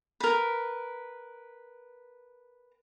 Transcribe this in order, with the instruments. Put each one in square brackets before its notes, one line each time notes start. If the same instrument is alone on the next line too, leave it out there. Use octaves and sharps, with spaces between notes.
[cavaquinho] A#4 B4